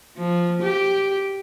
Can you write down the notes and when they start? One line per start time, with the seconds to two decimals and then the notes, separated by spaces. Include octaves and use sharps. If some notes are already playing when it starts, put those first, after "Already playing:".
0.17 F3
0.62 G4